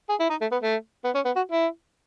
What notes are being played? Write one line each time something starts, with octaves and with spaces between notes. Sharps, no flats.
G#4
E4
D#4
A3
B3
A3
B3
C#4
B3
F#4
E4